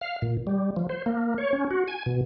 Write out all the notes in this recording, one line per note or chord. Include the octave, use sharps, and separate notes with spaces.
F5
A#2
G3
F3
C5
A#3
C#5
C#4
F#4
G#5
B2